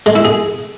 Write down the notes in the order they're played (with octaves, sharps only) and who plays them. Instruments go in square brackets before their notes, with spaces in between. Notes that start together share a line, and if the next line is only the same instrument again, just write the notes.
[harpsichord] G#3
E4
G#4